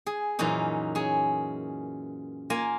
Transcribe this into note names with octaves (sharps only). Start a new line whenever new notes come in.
G#4
F#2 A#2 E3 C#4 D#4
C#4 G#4
A#3 F4 G#5